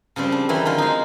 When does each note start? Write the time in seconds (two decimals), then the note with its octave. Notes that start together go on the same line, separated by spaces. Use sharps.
0.16 C#3 F3 G3 C4
0.32 D4
0.49 D#3 E3 F#3 C4
0.65 D3 F3 F4
0.78 G#3 D#4